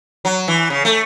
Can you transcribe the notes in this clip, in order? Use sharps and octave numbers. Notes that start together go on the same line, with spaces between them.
F#3
E3
C#3
A3